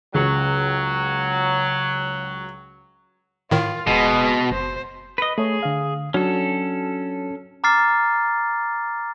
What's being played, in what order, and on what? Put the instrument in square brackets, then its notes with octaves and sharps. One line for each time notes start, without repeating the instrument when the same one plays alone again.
[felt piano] C#2 [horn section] F#3
[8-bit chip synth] A2 D#3 [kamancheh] F4
[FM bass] D#1 [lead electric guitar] B2 [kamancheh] G#3 B3
[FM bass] F#1 [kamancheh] C5
[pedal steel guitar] B4 D#5
[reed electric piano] A3 C#5 [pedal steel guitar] G#4
[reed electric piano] D3 F5
[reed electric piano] F#3 D4 F#4 [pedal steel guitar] C#4 A4
[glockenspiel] A#5 D6 F6 A6 C7